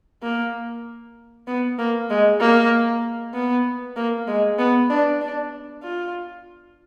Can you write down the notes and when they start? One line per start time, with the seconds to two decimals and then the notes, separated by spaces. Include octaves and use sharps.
0.23 A#3
1.47 B3
1.78 A#3
2.10 G#3
2.40 A#3
3.34 B3
3.96 A#3
4.27 G#3
4.59 B3
4.90 D4
5.21 D4
5.83 F4